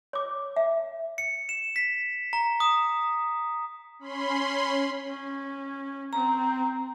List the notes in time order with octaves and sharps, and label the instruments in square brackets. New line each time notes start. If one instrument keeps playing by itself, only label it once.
[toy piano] C#5 D6
E5
[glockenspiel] C#7
E7
B6
A#5
D#6
[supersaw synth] C#4 B5 C6
[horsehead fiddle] C#4
[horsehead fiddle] C4 [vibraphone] A#5